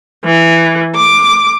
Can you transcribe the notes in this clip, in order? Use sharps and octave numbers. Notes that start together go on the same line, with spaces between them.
E3
D6